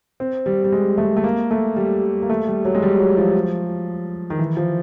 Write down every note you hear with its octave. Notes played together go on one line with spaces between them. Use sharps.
C4
G3
G3
G#3
A3
A3
A#3
A3
G3
A#3
A3
G3
F#3
G#3
G3
F#3
F3
D#3
E3
F3